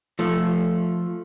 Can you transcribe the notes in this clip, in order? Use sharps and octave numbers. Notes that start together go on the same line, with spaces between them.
F3 A3